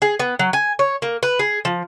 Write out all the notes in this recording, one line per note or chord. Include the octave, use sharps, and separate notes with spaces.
G#4
B3
F#3
G#5
C#5
A#3
B4
G#4
F3